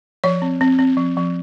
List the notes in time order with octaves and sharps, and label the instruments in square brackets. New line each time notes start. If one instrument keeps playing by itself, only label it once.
[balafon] F3 C#5
C4
C4
C4
F3
F3